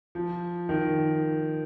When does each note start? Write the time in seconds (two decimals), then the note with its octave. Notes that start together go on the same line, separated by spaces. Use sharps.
0.15 F3
0.69 D#3